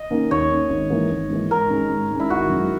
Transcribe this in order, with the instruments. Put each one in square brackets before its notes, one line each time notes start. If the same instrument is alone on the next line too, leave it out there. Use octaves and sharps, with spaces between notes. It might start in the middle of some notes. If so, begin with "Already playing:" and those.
Already playing: [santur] D#5
[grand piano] D#3 A#3 C#4
[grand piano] D#2 [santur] C#5
[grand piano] D#3 A#3 C#4
G#1
G#2 E3 A#3
G#1
G#2 E3 A#3
[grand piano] G#2 [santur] A#4
[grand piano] D#3 G#3 C#4
G#2
D#3 G#3 C#4
[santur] E4
[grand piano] G#1 [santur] F#4
[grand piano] F#2 D#3 G#3